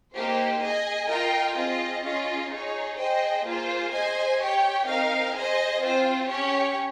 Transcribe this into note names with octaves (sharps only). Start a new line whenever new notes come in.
A#3 D#4 G4 C5
G#4 D#5 G#5
F4 A#4 D#5 G5
C4 F4 G#4 D#5
C#4 F4 G#4 D#5
D#4 G#4 C#5
G#4 C5 D#5 G5
A#3 F4 G#4 C5
G#4 C5 D#5 G#5
G4 C#5 G5
C4 D#4 A#4 F5
G#4 C5 D#5 G#5
C4 F4 C5
C#4 G4 C#5